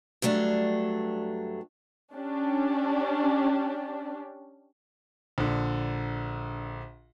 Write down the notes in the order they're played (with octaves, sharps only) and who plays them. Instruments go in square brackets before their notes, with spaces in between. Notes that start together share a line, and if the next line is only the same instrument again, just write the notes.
[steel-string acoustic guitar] G2 F#3 A3 D4
[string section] C#4 D4 G4
[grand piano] A#1 D3